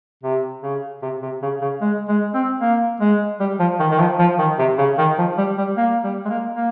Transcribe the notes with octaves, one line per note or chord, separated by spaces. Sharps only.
C3
C#3
C3
C3
C#3
C#3
G#3
G#3
C4
A#3
G#3
G3
F3
D#3
D#3
F3
F3
D#3
C3
C#3
D#3
F3
G3
G3
A#3
G3
G#3
A#3
A#3